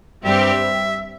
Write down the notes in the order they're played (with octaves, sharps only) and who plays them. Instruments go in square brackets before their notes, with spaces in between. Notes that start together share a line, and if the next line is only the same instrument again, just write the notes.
[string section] G2 G3 C4 G4 [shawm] E5